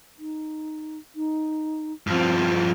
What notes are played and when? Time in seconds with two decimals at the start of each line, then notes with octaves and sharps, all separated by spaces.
0.19 D#4
1.15 D#4
2.07 G2 F3 C4